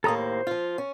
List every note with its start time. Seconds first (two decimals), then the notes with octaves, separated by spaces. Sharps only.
0.04 D#2 A2 A#3 A4 A#5 D#6
0.18 C5
0.47 F3 F4
0.78 C#4